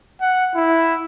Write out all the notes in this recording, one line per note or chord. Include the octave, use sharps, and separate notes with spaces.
F#5
E4